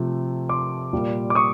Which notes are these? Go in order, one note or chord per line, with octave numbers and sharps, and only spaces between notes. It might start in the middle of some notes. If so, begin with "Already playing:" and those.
Already playing: C3 F3 A3
C6 D6
A#2 G3 A#3
D6
C#6 D#6